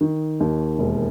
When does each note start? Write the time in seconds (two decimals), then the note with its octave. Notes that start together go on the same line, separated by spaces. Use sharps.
0.01 D#3
0.40 D#2
0.79 E1